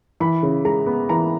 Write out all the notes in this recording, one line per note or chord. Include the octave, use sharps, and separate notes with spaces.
E3 B5
C#3
G#3 A#5
B3
E3 A#5